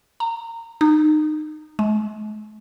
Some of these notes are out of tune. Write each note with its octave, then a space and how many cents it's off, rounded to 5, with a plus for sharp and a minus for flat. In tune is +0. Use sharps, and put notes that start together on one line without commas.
A#5 -25
D#4 -25
G#3 +45